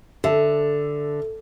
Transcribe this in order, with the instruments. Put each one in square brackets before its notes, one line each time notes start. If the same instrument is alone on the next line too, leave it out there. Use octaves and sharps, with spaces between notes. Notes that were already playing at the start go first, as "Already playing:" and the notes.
[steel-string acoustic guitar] D3 [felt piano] A4 E5